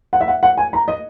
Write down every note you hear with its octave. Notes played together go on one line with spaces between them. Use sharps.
F#5
E5
F#5
F#5
G#5
A#5
D#5